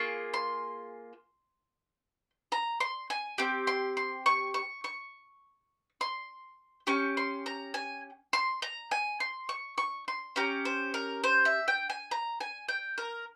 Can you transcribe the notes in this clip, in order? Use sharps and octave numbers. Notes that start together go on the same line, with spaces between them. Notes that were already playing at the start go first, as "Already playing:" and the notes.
Already playing: A#3 F4 G#4 C#6
C6
A#5
C6
G#5
C4 G4
C6
C6
C#6
C#6
C#6
C6
C#4 G4 C#6
C6
A#5
G#5
C6
A#5
G#5
C6
C#6
C#6
C6
C#4 G4 A#5
C5
A#4
C5
E5
G5
G#5
A#5
G#5
G5
A#4